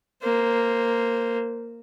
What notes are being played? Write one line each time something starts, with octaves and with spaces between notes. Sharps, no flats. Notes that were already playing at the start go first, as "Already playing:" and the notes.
A#3 C5